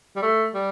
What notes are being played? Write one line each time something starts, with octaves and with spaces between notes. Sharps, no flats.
G3
A3
G3